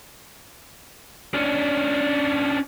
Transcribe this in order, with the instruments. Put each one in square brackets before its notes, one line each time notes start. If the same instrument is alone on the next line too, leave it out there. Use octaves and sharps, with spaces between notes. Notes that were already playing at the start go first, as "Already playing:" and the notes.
[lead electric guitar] C#4 D4